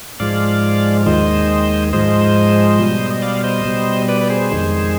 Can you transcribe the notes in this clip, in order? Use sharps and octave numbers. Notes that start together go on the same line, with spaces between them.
G#2 F3 G#3 D5 F5
D#2 D#3 G#3 C5 D#5
G#2 F3 G#3 C5 D#5
B2 G3
D#5
D5 F5
C5 D#5
B2 G3
B4 D5
B4
G#4 C5
F2 D#3 G#3